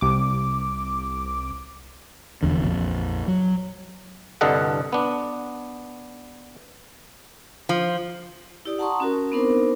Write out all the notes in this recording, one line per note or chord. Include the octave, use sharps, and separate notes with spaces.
C2 D6
F1 E2 D3
A#1 F2
F#3
C2 G2 D3 A4 D#5 F#5
B3 D4
F3
E4 G4 D5 D#6
F#5 A5 A#5 C6 C#6 D#6
C#4 F#4 A#4
B3 C4 D4 D#4 A#4 C5